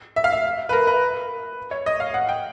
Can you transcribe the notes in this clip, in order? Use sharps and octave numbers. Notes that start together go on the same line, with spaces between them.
E5
F5
E5
B4
A#4
B4
C#5
D#5
F5
F#5
G5